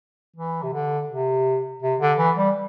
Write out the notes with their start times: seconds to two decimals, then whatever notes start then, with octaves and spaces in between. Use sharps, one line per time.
0.36 E3
0.63 C3
0.73 D3
1.09 C3
1.82 C3
2.00 D3
2.18 E3
2.37 G3